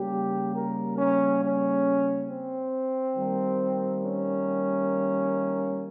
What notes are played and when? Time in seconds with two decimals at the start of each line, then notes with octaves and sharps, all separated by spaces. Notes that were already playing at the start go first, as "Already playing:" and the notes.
Already playing: C#3 G3 A#3 G4
0.54 A#4
0.97 C#4
1.42 C#4
2.29 C4
3.17 D#3 G3 A#3
4.04 C#4